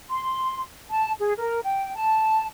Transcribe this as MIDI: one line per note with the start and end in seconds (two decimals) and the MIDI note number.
0.10 0.61 84
0.90 1.11 81
1.19 1.33 68
1.39 1.60 70
1.63 1.95 79
1.95 2.48 81